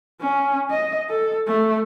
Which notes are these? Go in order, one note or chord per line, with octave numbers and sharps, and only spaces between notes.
C#4
D#5
A4
A3